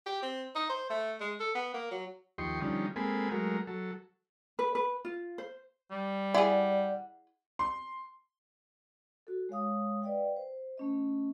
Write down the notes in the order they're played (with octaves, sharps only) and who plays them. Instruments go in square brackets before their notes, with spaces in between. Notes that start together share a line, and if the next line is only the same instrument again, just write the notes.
[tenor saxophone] G4
C4
D#4
C5
A3
G#3
A4
B3
A#3
F#3
[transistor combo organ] D#2 F3 G4 D#5 C6 C#6
D3 F3 G3 C#4 D#4
G#3 A#3 C4 A4 G#5 B5
F#3 G#3 A3 A#4
F#3 A4
[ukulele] B4
B4
F4
C5
[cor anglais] G3
[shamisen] E4 G#4 [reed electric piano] D5 [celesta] F#5
[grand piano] C6
[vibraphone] F#4 A4
G#3 C#5 F5 D#6
B4 D5 D#5 F5 G5
C5
A3 C#4 D#5